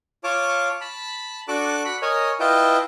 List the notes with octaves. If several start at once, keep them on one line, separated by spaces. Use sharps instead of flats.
F4 C#5 A5 D6
A5 B5
D4 F#4 A4 A5 D6 F#6
F#5 B5
A#4 C#5 D#5 G#5
E4 F4 B4 D#5 G5 A5